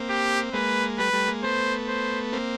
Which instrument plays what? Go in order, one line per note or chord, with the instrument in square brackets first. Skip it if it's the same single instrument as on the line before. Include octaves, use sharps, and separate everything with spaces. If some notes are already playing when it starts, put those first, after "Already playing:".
Already playing: [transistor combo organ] A#3 C4
[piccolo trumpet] G4
[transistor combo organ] G#3 A#3 [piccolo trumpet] B4
[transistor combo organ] G3 A3 [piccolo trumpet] B4
[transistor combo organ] G3 A3
G#3 A#3
[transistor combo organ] A3 B3 [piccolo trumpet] C5
[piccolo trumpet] C5
[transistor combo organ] A#3 C4